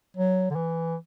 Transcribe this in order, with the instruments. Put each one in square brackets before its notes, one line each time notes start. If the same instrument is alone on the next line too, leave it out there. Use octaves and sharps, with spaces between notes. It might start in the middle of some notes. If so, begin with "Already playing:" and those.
[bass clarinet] F#3
D3
E3